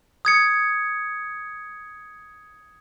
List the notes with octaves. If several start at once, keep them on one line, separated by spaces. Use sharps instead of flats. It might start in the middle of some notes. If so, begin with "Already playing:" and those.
D#6 G#6 C#7